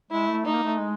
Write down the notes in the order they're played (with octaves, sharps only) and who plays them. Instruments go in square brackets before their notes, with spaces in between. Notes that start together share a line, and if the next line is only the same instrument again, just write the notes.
[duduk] G#3 [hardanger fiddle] E4
[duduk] A3
[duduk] A3 [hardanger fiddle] D#4
[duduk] A#3
A3
G#3